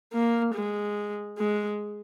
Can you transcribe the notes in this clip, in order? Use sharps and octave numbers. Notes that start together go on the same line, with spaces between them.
A#3
G#3
G#3